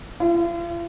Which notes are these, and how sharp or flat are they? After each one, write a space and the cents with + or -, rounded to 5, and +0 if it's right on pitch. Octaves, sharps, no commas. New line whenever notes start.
F4 -45